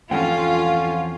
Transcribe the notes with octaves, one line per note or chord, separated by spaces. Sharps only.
E2 F3 C4 C#4 F4 A4 F#5 G5